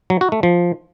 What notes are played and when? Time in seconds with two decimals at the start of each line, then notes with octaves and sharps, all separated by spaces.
0.10 F#3
0.21 F#4
0.32 A3
0.43 F3